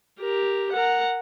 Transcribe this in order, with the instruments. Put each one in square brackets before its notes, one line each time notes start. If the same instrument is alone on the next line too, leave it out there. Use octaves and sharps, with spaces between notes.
[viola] G4 A#4
A#4 F#5